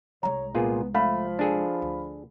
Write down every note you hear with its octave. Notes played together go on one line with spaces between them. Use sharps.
C2 G#3 C#5 A#5
A#2 B3 F4 G#4
F3 A3 F5 B5
D4 G#4 A4
D2